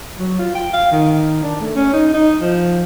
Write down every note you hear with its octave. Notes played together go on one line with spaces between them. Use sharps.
F#3
F4
G5
F5
D#3
D4
A3
C#4
D#4
D#4
F3